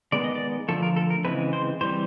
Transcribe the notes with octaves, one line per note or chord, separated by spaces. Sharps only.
D#3 G#3 B3 D5
D#5
D5
D3 F3 A3 A4
A#4
A4
A#4
C#3 E3 G#3 C4 B4
C5
E3 G3 C4 C5